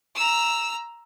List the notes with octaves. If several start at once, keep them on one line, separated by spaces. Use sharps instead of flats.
A#5 E6